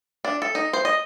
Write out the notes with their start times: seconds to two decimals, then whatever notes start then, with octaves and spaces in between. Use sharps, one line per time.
0.25 D4
0.42 A4
0.55 D#4
0.73 C5
0.85 D#5